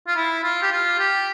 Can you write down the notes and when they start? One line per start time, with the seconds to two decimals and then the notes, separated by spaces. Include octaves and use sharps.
0.07 F4
0.16 E4
0.43 F4
0.62 G4
0.72 F4
0.99 G4